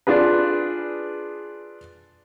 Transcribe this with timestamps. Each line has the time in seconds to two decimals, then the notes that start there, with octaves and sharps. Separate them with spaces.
0.07 D4 F4 G#4 B4